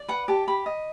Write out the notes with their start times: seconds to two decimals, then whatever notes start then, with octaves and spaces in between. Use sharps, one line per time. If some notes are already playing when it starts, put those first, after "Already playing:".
Already playing: D5
0.08 B4 F#5
0.28 G4 A5
0.48 G4 B5
0.66 D#5